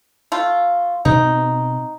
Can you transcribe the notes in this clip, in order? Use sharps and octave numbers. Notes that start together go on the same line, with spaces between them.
A3 F4
B2 C4 D#4